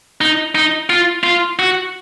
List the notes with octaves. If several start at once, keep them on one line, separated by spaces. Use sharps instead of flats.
D#4
D#4
F4
F4
F#4